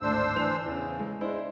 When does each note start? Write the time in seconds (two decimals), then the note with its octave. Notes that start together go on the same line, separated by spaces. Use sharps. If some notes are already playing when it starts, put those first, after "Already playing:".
0.01 G#1 D2 A2 D4 C5 E6
0.36 E3 F7
0.66 E2 C#3
0.99 G#3
1.21 G#3 D4 E4 C5